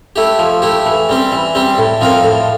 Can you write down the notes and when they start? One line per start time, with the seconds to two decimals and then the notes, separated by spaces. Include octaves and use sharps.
0.16 A3 E4 G4
0.39 F3
0.62 A3 E4 G4
0.86 E3
1.09 G3 C4 G4
1.32 E3
1.55 G3 C4 G4
1.78 A2
2.01 F3 C4 F4 A#4
2.24 A2